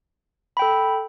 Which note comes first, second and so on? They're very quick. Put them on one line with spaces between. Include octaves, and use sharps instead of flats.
B5 G5 A4